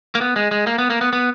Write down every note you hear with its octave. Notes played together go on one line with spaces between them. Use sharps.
A#3
B3
G#3
G#3
A#3
B3
A#3
B3
B3